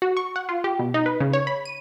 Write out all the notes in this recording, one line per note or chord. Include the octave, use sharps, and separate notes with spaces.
F#4
C#6
F#5
F4
G4
B2
D#4
B4
C#3
C#5
B5
D#7